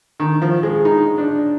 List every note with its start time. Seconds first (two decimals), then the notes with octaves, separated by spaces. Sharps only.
0.20 D#3
0.42 F3
0.63 G#3
0.85 D#4
1.18 D4